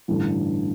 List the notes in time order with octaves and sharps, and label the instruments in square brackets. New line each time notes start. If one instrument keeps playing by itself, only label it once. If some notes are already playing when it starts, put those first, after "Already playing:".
[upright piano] A1 G2 D3